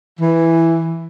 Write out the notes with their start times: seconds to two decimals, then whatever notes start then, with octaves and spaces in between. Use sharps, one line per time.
0.20 E3